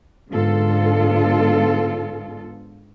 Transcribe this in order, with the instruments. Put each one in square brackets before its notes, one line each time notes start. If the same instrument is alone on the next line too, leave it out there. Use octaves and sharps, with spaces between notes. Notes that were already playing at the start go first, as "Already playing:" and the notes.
[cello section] G#2 D3 B3 F4 A4